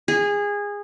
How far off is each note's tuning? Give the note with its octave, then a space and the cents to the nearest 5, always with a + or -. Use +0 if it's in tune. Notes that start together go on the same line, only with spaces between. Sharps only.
G#4 -20